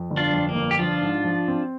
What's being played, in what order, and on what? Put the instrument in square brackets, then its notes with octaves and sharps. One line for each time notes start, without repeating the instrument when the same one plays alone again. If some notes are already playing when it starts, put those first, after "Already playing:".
Already playing: [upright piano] F2
G1
[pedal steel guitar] D4 F4
[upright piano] F2
[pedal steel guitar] A#3
[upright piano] G1
[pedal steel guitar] G4
[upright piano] F3 [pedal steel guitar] D4 F4
[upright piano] G#2
F3
C4